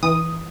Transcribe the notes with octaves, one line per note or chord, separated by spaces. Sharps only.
E3 D#6